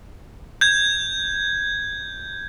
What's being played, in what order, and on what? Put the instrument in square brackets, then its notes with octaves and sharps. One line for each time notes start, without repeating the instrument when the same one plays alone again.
[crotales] G6 G#6